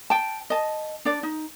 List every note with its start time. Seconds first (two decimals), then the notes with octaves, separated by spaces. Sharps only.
0.10 G5 A5
0.50 D#5 A5
1.05 D4 D5
1.23 D#4